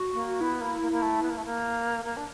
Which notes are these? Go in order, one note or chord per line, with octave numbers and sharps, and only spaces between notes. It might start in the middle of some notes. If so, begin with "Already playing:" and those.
Already playing: F#4
A#3
B3 E4
A#3
A#3
A#3
A3
B3
A#3
A3
A#3
A#3
D4